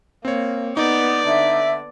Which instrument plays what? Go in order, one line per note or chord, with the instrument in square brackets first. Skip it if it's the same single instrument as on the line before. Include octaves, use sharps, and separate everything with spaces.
[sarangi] A#3 [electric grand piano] C4 C#5
[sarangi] B3 [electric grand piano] D#4 [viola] D5
[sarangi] D3 [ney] E5